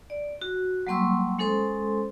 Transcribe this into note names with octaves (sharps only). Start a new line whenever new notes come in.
D5
F#4
F#3 G3 A#3 C6 C#6 E6
G#3 C#4 A4 C5 C6